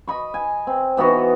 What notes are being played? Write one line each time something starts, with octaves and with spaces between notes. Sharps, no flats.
D#5 B5 C#6
G#5
C4
E3 B3 D#4 F#4